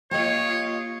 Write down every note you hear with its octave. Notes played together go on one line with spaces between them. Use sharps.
A#3 F4 G4 C#5 D#5